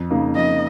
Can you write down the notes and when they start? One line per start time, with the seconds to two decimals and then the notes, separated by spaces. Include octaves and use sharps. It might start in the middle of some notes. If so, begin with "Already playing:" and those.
Already playing: F2
0.10 C#3 A#3 D#4
0.36 F2 D#5